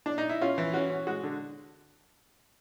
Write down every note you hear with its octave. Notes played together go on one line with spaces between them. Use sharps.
D4
D#4
E4
C#4 F4
E3
C#4 F#4
C#4
G#3 F#4
D3